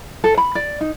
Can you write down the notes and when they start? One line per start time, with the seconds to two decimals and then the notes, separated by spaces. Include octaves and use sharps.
0.24 A4
0.37 B5
0.55 D5
0.81 D#4